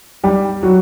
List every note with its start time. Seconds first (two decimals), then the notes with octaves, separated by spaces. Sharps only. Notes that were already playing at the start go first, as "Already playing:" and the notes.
0.24 G3 G4
0.63 F#3 F#4